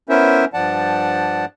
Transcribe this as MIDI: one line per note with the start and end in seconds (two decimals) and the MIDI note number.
0.09 0.45 59
0.09 0.45 61
0.09 0.45 64
0.09 0.45 70
0.09 0.45 72
0.09 0.45 76
0.54 1.45 43
0.54 1.45 53
0.54 1.45 74
0.54 1.45 78
0.54 1.45 81